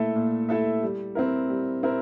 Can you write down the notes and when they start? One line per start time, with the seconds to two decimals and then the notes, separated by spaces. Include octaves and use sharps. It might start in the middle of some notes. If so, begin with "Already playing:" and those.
Already playing: A#2 A3 E4 A4 E5
0.16 A#2
0.49 A3 E4 A4 E5
0.83 G3
1.15 C4 E4 A#4
1.49 G3
1.83 C4 E4 A#4